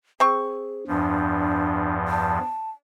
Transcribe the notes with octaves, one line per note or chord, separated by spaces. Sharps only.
C4 G#4 C#6
E2 G2 F3 D4
A5